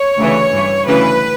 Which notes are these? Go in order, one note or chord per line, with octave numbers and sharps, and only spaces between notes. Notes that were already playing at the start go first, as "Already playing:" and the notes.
Already playing: C#5
D2 C#3 E3
G2 E3
D2 C#3 E3 B4